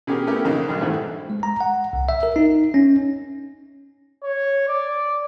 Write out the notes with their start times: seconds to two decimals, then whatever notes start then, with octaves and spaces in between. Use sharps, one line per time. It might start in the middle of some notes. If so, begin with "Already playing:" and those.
0.07 B2 C#4 G4 G#4 A#4
0.27 A3 B3 C#4 E4 G4 A#4
0.44 B1 F2 C#3 A#3 D#4
0.68 B1 G2 D4
0.81 G#2 D#3 E3 G3 A3 C4
1.30 G#3
1.43 A#5
1.61 F#5
1.93 C2
2.09 E5
2.23 A#4
2.36 D#4
2.74 C#4
4.23 C#5
4.68 D5